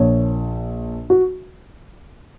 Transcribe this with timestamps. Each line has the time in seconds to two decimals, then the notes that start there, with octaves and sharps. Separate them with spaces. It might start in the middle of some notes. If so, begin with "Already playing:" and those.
Already playing: A#1 A#2 C#5
1.10 F#4